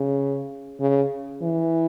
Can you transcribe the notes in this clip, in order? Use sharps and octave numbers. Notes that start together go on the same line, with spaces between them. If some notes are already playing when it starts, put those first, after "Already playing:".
Already playing: C#3
C#3
E3